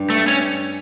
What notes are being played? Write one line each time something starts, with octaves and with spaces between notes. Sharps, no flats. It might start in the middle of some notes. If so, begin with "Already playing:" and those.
Already playing: G2
A3
C#4